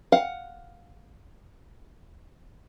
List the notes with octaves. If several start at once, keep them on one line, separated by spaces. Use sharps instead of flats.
F5 F#5